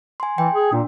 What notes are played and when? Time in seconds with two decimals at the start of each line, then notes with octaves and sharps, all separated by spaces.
0.20 G#5 C6
0.38 E3 G5
0.53 G#4
0.72 A#2 D4